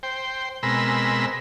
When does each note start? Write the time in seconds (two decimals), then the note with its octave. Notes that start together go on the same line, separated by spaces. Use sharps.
0.03 C5 G5
0.63 B2 G#3 C4 A#4 B5 E6